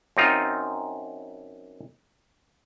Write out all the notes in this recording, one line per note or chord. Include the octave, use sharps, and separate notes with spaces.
F#2 C4 D#4 F4